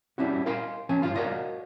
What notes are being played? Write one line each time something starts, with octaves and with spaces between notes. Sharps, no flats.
G3 C#4 D4 E4 F#4
A#4 D#5 F5 G#5 C6
F3 C#4 G#5
G2 E3 F4 F5 C6
F#4 A#4 D5 D#5 F5